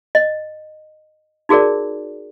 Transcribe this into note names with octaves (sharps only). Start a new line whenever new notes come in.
D#5
D#4 F#4 G#4 A#4 D5